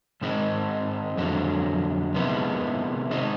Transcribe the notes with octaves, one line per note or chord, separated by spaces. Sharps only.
G#2 D#3 G#3 C4 D#4
F2 D3 F#3
C3 D#3 G#3 B3 E4
D#3 G#3 C4 D#4